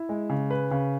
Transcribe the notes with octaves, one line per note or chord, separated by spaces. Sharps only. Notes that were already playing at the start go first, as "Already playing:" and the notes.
Already playing: E4
G#3
C#3
B4
C#3